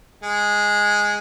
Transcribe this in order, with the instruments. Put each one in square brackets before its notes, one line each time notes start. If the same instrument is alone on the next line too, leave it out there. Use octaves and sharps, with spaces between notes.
[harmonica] G#3